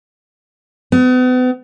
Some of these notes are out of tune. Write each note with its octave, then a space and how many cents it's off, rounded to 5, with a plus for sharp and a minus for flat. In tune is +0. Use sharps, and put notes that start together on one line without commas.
B3 +40